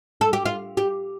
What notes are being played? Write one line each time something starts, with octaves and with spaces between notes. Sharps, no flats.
A4
G4
F4
G4